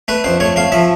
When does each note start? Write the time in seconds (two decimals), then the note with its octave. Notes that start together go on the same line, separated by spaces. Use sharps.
0.08 A3 B4
0.24 F2 C5
0.40 A3 C#5
0.56 A3 F5
0.72 F3 E5